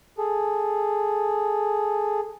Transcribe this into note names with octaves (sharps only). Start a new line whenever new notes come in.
G#4 A4